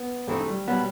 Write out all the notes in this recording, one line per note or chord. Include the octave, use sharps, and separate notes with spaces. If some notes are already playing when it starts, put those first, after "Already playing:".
Already playing: B3
G2 E3 G#3 A3 C4 D#4
G3
B2 F#3 G3 B3